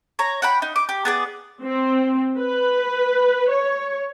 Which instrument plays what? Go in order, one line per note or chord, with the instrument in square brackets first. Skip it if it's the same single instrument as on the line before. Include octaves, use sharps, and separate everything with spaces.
[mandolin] C#5 A#5
F#5 G5 B5
D#4
D6
G4
B3 G#4 D5
[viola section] C4
B4
C#5